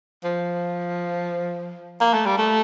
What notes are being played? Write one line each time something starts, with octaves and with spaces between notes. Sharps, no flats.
F3
A#3
A3
G3
A3